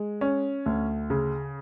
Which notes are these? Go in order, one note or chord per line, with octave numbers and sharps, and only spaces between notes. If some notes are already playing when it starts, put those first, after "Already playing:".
Already playing: G#3
C#4
D2
C#3